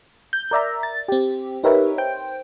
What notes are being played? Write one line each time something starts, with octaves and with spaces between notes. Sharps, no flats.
G6
A#4 D5 E5 A#5
A6
C4 G4
D#4 G4 A#4 B4 C#5 E5
C5 G5